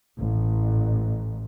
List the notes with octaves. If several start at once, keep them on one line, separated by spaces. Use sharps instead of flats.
A1